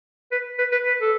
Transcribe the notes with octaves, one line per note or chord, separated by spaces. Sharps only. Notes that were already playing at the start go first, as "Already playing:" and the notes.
B4
B4
B4
B4
A4